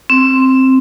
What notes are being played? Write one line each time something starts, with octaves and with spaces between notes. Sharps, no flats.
C4